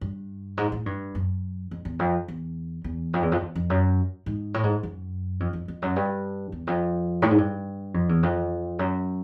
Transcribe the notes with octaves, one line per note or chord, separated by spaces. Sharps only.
G2
G#2
A2
G2
F#2
F2
E2
F2
E2
E2
F2
E2
F2
E2
F2
F#2
G#2
A2
G#2
F#2
F2
F2
F2
F#2
G2
E2
F2
A2
G#2
G2
F2
E2
F2
F#2